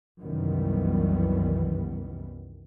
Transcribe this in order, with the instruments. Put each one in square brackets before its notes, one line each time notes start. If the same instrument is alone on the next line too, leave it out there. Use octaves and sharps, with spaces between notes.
[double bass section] C2 F#2 D#3 E3 G3 B3